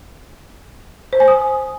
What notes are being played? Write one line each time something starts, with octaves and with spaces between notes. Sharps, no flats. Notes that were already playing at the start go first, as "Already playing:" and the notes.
C5
G#5
D#6